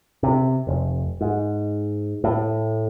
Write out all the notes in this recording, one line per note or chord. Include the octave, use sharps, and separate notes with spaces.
C3
F1
G#2
A2